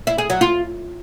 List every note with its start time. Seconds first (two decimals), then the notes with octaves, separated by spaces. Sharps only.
0.07 E4
0.18 G#4
0.30 F#3
0.41 F4